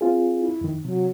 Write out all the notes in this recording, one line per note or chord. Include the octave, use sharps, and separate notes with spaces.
C4 F4 G#4
E4
F2 D#3
C3 F#3